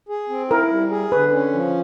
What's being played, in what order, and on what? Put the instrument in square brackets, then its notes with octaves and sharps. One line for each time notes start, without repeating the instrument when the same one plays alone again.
[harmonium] G#4
C4
[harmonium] E4 [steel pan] A#4
[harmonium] G3
G#4
[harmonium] D3 [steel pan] B4
[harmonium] C#4
F3